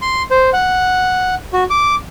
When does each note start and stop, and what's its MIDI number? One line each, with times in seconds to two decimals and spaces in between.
0.02 0.23 84
0.31 0.50 72
0.53 1.35 78
1.53 1.64 66
1.70 1.95 86